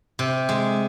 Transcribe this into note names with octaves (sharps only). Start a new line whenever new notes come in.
C3
G#3